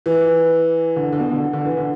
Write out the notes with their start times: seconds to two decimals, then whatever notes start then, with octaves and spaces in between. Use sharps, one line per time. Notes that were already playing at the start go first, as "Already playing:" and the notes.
0.06 E3
0.96 D3
1.12 D3
1.19 B2
1.31 D3
1.53 D3
1.65 E3
1.77 D3